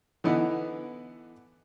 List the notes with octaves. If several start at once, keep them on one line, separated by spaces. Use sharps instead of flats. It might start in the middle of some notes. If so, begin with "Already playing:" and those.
D3 E3 B3 D#4 E4